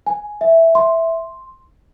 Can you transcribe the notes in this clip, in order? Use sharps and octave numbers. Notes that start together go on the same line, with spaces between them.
G#5
E5
C6